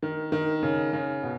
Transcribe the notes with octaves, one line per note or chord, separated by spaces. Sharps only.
D#3
D#3
C#3
C#3
B2